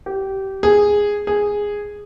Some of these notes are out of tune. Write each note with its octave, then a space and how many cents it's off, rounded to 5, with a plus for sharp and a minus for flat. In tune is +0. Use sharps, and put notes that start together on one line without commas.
G4 -20
G#4 -5
G#4 -5